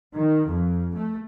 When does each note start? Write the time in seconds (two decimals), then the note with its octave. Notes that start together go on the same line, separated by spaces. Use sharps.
0.15 D#3
0.47 F2
0.95 A3